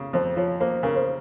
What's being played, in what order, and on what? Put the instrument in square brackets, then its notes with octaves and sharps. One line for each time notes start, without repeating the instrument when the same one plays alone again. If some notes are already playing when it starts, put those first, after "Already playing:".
Already playing: [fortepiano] C#3 A#3
[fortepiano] F2 [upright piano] C5
[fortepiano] F3 [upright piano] C#5
[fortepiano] A#3 [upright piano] C5
[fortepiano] C#3 [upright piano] A#4
[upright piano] C5